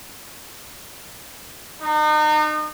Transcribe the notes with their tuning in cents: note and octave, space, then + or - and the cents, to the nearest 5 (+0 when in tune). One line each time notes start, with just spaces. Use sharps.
D#4 -35